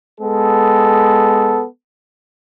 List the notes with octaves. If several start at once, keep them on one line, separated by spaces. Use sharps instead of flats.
G#3 B3 A4